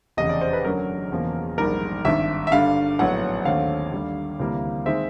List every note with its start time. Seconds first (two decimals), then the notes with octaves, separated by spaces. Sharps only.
0.17 F1 E2 C#3 D#5
0.29 D5
0.41 C5
0.53 B4
0.64 F#2 D3 F#3 A#4
1.11 E1 E2 C#3 F3 A#3
1.58 A#1 G#2 D#3 G3 A#4
2.05 G#1 G2 D#3 E5
2.47 E5
2.52 G2 D3 G3 F5
2.99 A#1 A2 F#3 B3 F#5
3.45 D#2 D3 F#3 A3 C4 F5
3.92 D#2 D3 G3
4.40 D2 C3 E3 G3 A#3
4.86 D#3 G#3 C4 E5